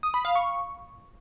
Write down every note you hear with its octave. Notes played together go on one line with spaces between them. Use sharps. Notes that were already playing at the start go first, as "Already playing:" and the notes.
D#6
B5
F5
C#6